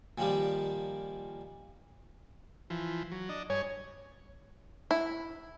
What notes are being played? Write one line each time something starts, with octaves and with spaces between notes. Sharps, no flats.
A#2 D#3 F3 G3
E3 F3
F#3
D4 D#5
G2 C#5 G#5
E4